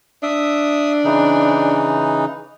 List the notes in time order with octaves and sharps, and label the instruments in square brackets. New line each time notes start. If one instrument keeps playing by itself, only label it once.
[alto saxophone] D4 [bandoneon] E5 D#6
[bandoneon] C#3 E3 D#4